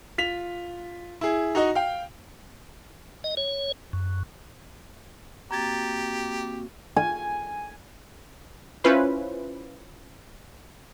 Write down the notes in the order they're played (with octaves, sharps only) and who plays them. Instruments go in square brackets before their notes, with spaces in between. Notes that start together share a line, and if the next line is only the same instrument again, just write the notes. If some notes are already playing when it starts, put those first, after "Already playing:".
[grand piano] F4 B6 F7
E4 G#4
D#4 F#4 D#5
F5 G5
[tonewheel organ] D#5
C#5
F#2
[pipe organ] A#3 C4 F#4 [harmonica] G4 [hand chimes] A#5 G#6 A6
[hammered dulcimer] G#5
[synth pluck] C#4 E4 F4 B4 C5